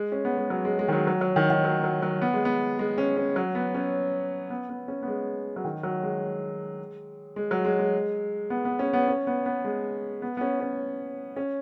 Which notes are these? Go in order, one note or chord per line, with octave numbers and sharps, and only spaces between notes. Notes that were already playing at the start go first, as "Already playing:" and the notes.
Already playing: G#3
C#4
B3
G#3
F#3
G#3
G#3
D#3
F#3
F#3
F#3
D#3
D#3
F#3
F#3
F#3
B3
G#3
B3
G#3
C#4
C#4
F#3
B3
C#4
B3
B3
C#4
B3
G#3
F#3
D#3
F#3
G#3
G#3
F#3
G#3
G#3
B3
B3
C#4
B3
C#4
B3
B3
G#3
B3
B3
C#4
C#4
C#4